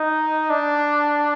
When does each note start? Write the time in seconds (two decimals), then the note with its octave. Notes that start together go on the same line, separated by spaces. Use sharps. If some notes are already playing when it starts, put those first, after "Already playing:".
Already playing: D#4
0.50 D4